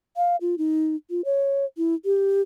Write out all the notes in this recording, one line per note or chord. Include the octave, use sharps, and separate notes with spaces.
F5
F4
D#4
F4
C#5
E4
G4